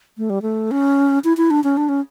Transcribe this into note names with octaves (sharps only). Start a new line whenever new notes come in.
A3
G3
A3
C#4
E4
E4
D4
C#4
D4
C#4